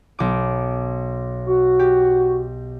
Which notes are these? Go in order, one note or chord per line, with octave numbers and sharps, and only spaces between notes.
B1 D6
F#4
G4